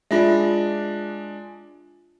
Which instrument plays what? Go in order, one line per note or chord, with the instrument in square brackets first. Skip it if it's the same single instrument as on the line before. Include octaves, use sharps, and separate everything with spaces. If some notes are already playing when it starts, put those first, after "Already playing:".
[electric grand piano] G#3 D4 [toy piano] F4 E5